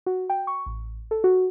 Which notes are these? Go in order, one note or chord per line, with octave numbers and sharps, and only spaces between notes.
F#4
G5
C#6
A1
A4
F#4